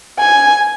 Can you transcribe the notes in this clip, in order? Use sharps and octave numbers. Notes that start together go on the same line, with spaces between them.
G#5